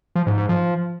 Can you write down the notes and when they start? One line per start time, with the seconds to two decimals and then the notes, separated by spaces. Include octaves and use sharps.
0.15 F3
0.27 G#2
0.38 G#2
0.49 F3